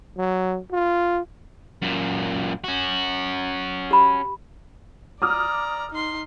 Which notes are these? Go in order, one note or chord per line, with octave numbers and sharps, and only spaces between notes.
F#3
F4
F#2 A#2
C#4 F#4
G4 B5
D5 A#5 D6 D#6 F6
D#4 C6